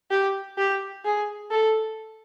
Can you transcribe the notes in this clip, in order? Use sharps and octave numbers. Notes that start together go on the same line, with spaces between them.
G4
G4
G#4
A4